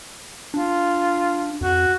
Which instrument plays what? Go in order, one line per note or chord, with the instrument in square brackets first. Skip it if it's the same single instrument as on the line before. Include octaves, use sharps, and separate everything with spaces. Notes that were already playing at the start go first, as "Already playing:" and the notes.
[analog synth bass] D4 [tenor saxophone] F4
[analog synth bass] F2 [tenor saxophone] F#4